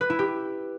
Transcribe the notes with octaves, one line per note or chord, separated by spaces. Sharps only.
B4
E4
G4